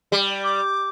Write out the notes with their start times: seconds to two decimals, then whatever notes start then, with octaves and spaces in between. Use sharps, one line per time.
0.12 G3
0.44 D6